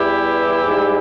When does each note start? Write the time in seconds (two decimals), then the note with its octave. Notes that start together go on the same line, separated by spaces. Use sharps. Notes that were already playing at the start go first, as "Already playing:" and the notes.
Already playing: E2 E3 G3 E4 G4
0.66 G#2 G3